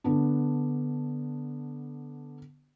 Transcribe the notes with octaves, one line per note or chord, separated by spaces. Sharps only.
D3 B3 D4